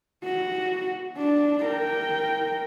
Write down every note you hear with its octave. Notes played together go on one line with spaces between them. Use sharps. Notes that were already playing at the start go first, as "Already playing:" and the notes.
F#4
D4
A#4 G5